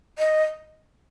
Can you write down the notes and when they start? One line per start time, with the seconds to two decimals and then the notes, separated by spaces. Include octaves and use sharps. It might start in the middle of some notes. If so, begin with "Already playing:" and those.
0.18 D#5